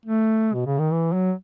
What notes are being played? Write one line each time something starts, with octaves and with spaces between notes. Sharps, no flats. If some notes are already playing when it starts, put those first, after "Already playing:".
A3
B2
C#3
D#3
E3
F#3